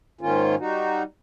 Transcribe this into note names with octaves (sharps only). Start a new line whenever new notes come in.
G#2 D#3 A#3 C#4 F4
G3 D#4 F#4